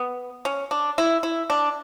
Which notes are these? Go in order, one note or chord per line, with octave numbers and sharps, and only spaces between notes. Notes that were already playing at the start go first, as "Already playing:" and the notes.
Already playing: B3
C#4
D4
E4
E4
D4